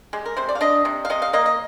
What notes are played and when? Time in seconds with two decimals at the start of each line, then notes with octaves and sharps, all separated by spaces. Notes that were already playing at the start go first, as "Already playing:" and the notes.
0.13 G#3 G4
0.25 A#4
0.37 C3 C5
0.49 D5
0.55 F5
0.61 D4 D#5
0.85 C3
1.05 F5
1.10 C3 D#5
1.22 F5
1.33 A#3 D#5
1.46 D#5